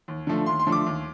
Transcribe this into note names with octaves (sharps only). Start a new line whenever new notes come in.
D#2
D3 F3 A3
D#2 C6
C6
D3 F3 A3
D6
D#2